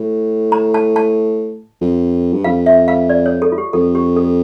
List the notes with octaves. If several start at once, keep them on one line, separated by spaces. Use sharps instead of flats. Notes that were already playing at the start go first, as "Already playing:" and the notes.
Already playing: A2
A#5
A5
A5
F2
G2
F2 F5
E5
F5
D5
C#5
A4
F4
G4
F2 A4
G4
A4